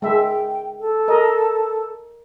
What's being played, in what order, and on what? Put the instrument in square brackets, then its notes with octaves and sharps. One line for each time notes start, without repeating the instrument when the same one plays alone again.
[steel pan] G#3 E5 [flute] G5
[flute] A4
[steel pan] A#4 D#5